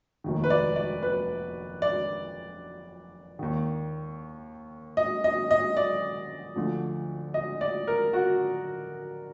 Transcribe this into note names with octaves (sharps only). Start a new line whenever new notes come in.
F1 D#2 D#3
B4
D5
D5
B4
D5
D#2 D#3
D#5
D#5
D#5
D5
D2 D3 F3
D#5
D5
A#4
F#4